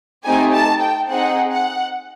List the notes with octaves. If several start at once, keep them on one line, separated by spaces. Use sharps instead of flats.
A3 C4 D#4 G4 G#5
A5
G5
C4 D#4 G#4 F#5
F#5